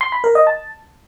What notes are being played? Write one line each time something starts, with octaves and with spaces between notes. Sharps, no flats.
C6
B5
A#4
D#5
A5